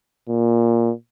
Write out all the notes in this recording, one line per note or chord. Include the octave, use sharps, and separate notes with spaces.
A#2